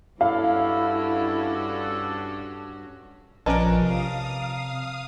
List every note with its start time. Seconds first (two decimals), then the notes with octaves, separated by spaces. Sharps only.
0.21 G2 C#4 D4 E4 F#4 A4 F5
3.46 A#1 F3 C#4 A#4 B4 D5 D#5 A5
3.82 C3 F5 D#6